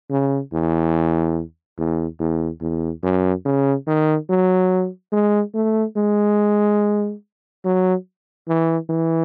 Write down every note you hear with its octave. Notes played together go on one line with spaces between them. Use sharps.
C#3
E2
E2
E2
E2
F#2
C#3
D#3
F#3
G#3
A3
G#3
F#3
E3
E3